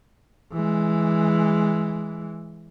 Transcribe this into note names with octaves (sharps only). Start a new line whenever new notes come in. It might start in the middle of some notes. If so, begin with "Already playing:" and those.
E3 G#3